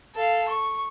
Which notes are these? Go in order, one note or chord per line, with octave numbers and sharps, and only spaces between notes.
A4 F5
C#6